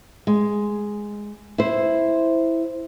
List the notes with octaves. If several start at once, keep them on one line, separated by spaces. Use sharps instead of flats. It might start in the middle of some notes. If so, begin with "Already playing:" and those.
G#3
E4 C5